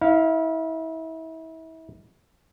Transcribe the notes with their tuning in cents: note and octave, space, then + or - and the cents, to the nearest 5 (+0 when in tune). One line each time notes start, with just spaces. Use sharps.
E4 -35 F5 +0